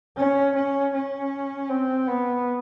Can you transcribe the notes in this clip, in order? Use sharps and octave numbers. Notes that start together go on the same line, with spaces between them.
C#4
C#4
C#4
C4
B3